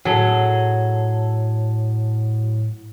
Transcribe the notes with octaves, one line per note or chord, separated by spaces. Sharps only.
A2 F#3 G#4 A4